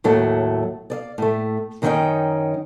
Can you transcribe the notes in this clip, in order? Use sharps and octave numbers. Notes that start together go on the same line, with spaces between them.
D#2 A2 F#3 A3
D5 D#5 F5
A2 A3
F#2 D#3 F#3 C#4 D#4 G5